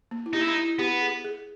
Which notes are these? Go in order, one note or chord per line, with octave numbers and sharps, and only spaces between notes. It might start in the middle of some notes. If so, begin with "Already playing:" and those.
A#3
E4
D#4 G4
E4
D#4
E4
B3 G4
G#4
G#4